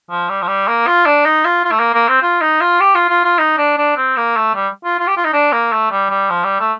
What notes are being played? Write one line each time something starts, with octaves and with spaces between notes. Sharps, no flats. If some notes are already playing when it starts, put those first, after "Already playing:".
F3
G3
F3
G3
A#3
F4
D4
D#4
F4
F4
A3
A#3
A#3
C4
F4
D#4
F4
G4
F4
F4
F4
D#4
D4
D4
C4
A#3
A3
G3
F4
F4
G4
F4
D#4
D4
A#3
A3
G3
G3
F3
G3
A3